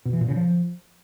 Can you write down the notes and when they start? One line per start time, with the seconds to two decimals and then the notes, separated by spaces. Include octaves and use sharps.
0.05 B2
0.13 E3
0.21 A#2
0.28 C#3
0.36 F3